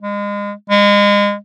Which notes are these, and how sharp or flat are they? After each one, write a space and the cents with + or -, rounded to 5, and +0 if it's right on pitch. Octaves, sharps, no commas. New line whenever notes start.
G#3 -30
G#3 -30